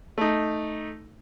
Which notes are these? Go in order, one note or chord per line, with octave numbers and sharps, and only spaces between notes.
A3 D#4